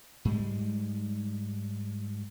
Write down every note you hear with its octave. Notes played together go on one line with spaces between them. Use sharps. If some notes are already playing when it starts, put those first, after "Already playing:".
G#2 G3 G#3